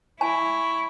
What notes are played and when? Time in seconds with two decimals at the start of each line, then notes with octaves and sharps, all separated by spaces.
0.21 E4 C#5 G#5